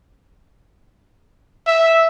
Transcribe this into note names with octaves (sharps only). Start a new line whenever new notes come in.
E5